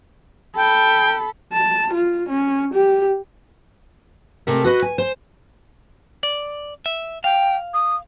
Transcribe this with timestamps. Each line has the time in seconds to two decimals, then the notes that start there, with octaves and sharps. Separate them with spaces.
0.56 A4 G5 B5
1.53 A5
1.94 F4
2.29 C#4
2.74 G4
4.47 C3 G#3 A3 A4 A#4 E5
4.64 F#4 B4 D#5
4.82 G#5
4.98 C5
6.23 D5
6.86 E5
7.24 F5 G5
7.74 D#6